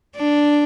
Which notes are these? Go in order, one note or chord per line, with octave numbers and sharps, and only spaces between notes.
D4